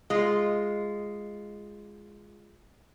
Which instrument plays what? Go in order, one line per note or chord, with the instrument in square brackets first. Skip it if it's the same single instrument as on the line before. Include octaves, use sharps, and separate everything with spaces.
[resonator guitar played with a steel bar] G#3 F4